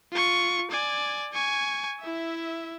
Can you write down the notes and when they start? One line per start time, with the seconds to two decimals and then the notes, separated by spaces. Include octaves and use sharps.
0.12 F4 C#6
0.70 D5 G#5
1.33 G#5 C#6
2.00 E4 E5